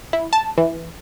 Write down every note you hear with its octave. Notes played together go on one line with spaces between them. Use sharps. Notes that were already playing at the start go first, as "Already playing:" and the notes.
E4
A5
E3